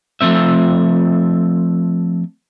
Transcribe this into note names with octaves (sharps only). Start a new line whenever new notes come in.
F3 A3 C4 E5